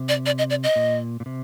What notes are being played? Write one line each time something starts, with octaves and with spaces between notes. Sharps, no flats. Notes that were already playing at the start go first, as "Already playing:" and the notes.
Already playing: C3
D5
D5
D#5
D5
D#5
A#2
A#2
C3